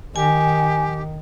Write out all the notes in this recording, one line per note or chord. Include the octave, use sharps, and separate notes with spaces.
D#3 G4 G#5